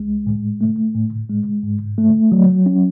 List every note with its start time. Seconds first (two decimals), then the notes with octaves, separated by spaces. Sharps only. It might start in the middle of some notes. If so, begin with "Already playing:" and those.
Already playing: C2 G#3
0.27 A2
0.61 A3
0.94 A2
1.29 G#3
1.63 G#2
1.98 A3
2.32 F#3
2.66 C#4